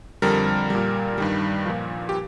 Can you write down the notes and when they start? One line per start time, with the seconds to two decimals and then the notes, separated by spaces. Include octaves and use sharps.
0.22 F2 D3 G3 A#4
0.70 A#2 G3
1.18 G2 D#3 G3
1.66 A#2 F3
2.09 G4